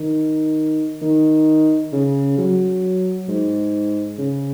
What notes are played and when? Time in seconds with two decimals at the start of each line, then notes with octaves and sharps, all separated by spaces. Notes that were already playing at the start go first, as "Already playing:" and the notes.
Already playing: D#3
1.01 D#3
1.92 C#3
2.38 F#3
3.28 G#2
4.18 C#3